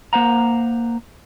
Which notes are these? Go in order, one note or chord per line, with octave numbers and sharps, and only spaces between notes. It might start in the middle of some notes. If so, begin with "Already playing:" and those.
A#3 C5 F#5 A#5